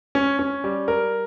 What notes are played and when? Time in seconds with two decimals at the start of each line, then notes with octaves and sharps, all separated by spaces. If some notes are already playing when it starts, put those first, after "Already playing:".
0.15 C#4
0.39 C#4
0.64 G3
0.88 A#4